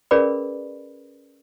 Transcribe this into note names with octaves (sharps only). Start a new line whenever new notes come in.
C#4 G#4 A#4 B4 D5 B5